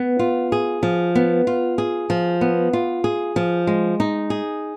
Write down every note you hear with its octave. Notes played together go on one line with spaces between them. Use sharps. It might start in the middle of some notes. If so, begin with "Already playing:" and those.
Already playing: B3
F4
G#4
F3
B3
F4
G#4
F3
B3
F4
G#4
F3
G#3
D#4
G#4